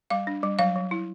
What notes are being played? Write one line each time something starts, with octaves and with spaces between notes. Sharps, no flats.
G3 F5
D4
G3
F#3 F5
F#3
E4